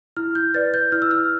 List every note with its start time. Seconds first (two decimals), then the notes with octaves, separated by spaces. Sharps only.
0.17 E4 F6
0.35 G6
0.54 B4 D5 A6
0.74 G6
0.92 E4 F6
1.02 E6
1.11 F6